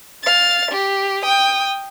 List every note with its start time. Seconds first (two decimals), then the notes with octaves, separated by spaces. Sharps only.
0.23 F5 A6
0.71 G4
1.23 G5 D#6